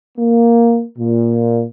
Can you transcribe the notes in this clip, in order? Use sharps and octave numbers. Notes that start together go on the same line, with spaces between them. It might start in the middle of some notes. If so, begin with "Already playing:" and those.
A#3
A#2